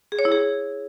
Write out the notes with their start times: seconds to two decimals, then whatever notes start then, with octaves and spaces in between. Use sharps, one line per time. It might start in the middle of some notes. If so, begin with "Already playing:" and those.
0.12 G#4
0.19 C#5
0.25 E4
0.32 G#4